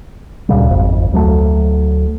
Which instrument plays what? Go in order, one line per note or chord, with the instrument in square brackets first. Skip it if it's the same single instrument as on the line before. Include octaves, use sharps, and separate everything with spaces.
[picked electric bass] D2 A#2 C#3 G3
D#1 G#1 F2
D2 F#3 G#3 A3